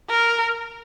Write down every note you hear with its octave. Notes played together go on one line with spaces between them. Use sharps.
A#4